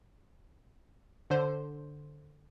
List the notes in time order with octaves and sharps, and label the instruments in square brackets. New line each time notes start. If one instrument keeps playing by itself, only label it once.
[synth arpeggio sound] D3 C5